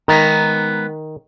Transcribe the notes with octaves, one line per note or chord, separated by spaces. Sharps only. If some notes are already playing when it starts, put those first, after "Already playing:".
D#3 G#3 B3 A#5